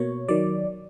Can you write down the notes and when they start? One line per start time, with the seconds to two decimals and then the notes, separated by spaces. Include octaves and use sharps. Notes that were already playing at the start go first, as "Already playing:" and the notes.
Already playing: B2 A#3 C#5
0.28 D#3 F#3 D5